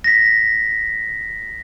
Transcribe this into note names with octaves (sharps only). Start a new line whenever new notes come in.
A#6 B6